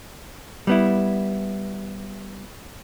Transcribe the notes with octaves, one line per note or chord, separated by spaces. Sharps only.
G3 B3 E4